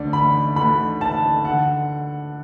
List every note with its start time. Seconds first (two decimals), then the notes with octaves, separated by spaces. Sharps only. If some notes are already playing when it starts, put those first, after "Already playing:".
Already playing: D2 D3 D5
0.13 B5
0.56 D2 D3 B5
1.01 A5
1.45 D3 F#5